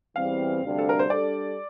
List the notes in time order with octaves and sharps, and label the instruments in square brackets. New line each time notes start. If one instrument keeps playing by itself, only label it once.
[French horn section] E2 E3 G3 C4 [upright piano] F5
[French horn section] D2 C3 G3 D4
[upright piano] A4
A#4
C5
[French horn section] G3 D4 A4 [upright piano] D5